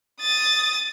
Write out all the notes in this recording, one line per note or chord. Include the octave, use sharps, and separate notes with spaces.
D#6 A6